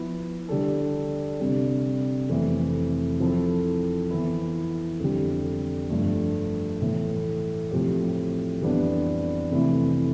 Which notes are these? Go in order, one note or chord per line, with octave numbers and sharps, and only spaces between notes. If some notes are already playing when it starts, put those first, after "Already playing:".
Already playing: F3 B3 E4
D3 G3 D4 A4
C3 G3 D4
F2 C3 E3 A3
F3 C4 E4 A4
E3 B3 E4
F2 D3 G3
G2 F3 A3
A2 E3 A3
A2 F3 C4 G4
F2 E3 G3 B3 D4
F2 C3 E3 A3 E4